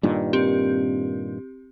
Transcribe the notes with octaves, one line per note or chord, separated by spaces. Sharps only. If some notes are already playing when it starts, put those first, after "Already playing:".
G2 A#2 D#3
C4 G4